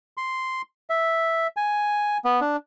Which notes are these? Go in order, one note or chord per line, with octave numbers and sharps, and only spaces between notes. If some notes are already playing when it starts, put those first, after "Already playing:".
C6
E5
G#5
B3
D4